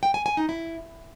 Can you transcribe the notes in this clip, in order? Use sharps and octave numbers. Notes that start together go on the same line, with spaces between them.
G5
G#5
G#5
D#4
E4